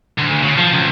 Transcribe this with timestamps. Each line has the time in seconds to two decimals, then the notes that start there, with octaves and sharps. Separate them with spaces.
0.18 D2
0.43 C#3
0.57 F3
0.73 C#2